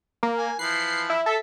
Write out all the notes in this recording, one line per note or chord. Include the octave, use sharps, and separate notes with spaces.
A#3
G#5
E3 F3 B4 C7
E4
A4 E5